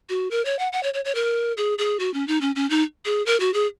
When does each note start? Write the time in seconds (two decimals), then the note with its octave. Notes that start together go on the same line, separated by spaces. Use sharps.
0.09 F#4
0.31 A#4
0.45 C#5
0.59 F#5
0.72 F#5
0.83 C#5
0.94 C#5
1.05 C#5
1.15 A#4
1.57 G#4
1.78 G#4
1.99 F#4
2.14 C#4
2.28 D#4
2.41 C#4
2.56 C#4
2.70 D#4
3.05 G#4
3.26 A#4
3.40 F#4
3.54 G#4